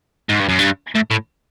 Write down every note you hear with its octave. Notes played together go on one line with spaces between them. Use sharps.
G#2
G2
F#2
G2
A2
A2